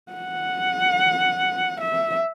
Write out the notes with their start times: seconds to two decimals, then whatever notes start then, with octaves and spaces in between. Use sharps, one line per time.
0.12 F#5
1.81 E5